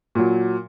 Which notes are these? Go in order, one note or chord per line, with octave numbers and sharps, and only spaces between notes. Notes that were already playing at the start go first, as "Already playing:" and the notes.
A#2 F#3